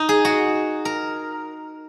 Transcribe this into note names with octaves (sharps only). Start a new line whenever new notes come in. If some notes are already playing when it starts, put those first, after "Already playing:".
Already playing: D#4
G#4
F#4
A#4